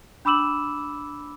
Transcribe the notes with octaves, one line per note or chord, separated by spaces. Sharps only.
D4 B5 D6 E6 E7 F#7